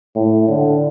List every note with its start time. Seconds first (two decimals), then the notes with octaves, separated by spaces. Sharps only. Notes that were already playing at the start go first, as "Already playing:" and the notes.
0.15 A2
0.48 D3